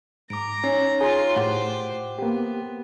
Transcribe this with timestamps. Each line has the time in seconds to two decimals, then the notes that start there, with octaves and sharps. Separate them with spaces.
0.30 G#2 A#5 D6 D7
0.64 C#4 D#4 C#5
1.01 F4 G#4 C#5 A#5 C6
1.36 A2 G4 C5 F#5 C6
2.19 A#3 B3 G4